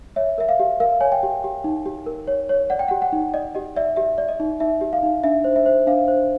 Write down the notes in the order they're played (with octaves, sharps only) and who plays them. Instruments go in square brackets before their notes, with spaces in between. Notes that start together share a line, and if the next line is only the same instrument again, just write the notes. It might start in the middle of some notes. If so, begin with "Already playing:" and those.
[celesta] C#5 E5
A#4 E5
F5
G4
A#4 F5
C#5 G#5
G5
G4
G4
D#4
G4
A#4
C#5
C#5
D5 F#5
G5
G4 F#5
F#5
D#4
D5 D#5
G4 D#5
D5 E5
G4 E5
D5
D#5
D#4
D#4 E5
G4
F5
D#4
D4 E5
C5
E5
C5
D4 F5
C5